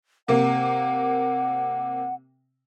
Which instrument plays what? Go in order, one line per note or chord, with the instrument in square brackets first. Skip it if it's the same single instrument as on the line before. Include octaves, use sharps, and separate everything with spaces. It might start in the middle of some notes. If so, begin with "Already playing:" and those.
[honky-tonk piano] C3 A#3 [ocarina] F#5